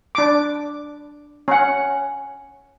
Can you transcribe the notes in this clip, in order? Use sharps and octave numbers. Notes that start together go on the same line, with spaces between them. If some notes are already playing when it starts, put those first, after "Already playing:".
D4 D6
C#4 F#5